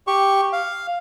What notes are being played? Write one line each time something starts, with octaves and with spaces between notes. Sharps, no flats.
G4 C#6
F5